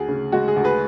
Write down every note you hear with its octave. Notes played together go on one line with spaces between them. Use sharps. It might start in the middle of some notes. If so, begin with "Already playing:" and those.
Already playing: D2 G#4
C#3
G#3 F#4
G#4
D2
G#4 B4